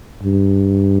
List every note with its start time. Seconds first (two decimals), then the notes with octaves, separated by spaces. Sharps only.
0.23 G2